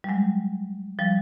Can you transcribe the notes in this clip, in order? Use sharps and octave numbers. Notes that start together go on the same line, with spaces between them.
G3
F#3 G#3
F3 G3